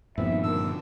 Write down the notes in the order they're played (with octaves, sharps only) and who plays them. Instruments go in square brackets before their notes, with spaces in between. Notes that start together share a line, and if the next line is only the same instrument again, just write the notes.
[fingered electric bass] G2 A#2 D#3 [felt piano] F3 B3 C4 [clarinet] E5
[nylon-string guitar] D3 A#3 [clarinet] E6